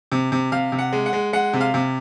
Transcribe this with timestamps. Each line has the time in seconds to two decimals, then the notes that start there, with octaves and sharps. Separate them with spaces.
0.12 C3
0.32 C3
0.52 C3 F5
0.72 C3
0.79 F#5
0.93 G#3
1.06 F#5
1.13 G#3
1.33 G#3 F#5
1.53 C3
1.61 F5
1.74 C3